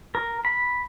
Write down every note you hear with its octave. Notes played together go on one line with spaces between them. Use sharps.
A#4
B5